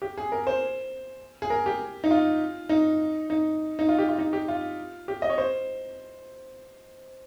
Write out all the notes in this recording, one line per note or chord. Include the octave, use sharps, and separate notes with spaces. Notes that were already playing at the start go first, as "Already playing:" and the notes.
G4
G#4
A#4
C5
G#4
A#4
G4
D#4
F4
D#4
D#4
D#4
F4
G4
F4
D#4
G4
F4
G4
D#5
C#5
C5